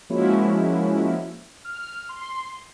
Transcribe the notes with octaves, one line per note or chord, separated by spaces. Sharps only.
F3 G#3 A#3 C#4 E4 F#4
F6
C6